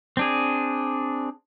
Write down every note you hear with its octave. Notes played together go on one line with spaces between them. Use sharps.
C4 D4 G#4